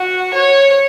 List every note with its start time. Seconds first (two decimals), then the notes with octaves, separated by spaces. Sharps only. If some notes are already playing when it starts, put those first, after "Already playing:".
Already playing: F#4
0.34 C#5